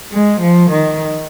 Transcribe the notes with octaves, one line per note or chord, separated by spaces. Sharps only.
G#3
F3
D#3